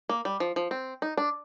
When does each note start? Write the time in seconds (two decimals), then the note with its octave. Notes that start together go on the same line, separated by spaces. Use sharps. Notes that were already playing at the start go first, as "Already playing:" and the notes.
0.09 A#3
0.25 G3
0.40 F3
0.56 F3
0.71 C4
1.02 D#4
1.17 D4